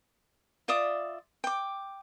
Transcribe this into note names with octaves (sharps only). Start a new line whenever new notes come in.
F4 D5 E5 D#6
G5 D6